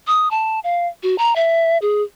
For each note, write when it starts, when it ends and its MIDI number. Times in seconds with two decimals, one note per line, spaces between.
0.07 0.29 87
0.31 0.60 81
0.64 0.88 77
1.03 1.16 66
1.18 1.33 82
1.36 1.78 76
1.82 2.02 68